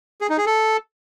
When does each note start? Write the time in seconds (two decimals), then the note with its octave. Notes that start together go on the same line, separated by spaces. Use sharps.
0.21 G#4
0.30 D#4
0.38 G#4
0.46 A4